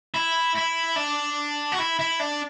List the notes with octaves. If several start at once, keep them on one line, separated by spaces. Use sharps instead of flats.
E4
E4
D4
F#4
E4
E4
D4